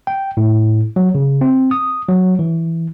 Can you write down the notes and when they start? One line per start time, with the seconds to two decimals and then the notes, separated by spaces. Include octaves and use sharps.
0.07 G5
0.37 A2
0.96 F#3
1.15 C#3
1.41 C4
1.71 D#6
2.09 F#3
2.39 E3